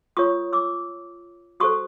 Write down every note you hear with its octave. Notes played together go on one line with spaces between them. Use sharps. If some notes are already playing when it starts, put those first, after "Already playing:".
F4 A#4 C#5 C#6 D#6
D6 E6
F#4 A4 C5 C#6 D#6